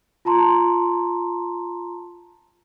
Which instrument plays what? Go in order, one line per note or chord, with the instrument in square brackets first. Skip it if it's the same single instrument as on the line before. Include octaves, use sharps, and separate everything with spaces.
[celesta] F4 A5 A#5 C6